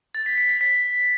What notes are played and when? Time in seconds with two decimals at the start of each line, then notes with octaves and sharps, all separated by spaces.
0.15 A6
0.26 B6
0.38 B6
0.49 A6
0.61 B6